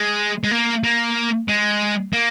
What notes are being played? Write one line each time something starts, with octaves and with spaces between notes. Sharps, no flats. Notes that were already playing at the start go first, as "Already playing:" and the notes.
Already playing: G#3
G#3
A#3
A#3
G#3
A#3